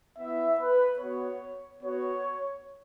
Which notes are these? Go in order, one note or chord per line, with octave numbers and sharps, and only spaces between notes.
B3 E4 E5
B4
B3 F#4 C#5
B3 F#4 C#5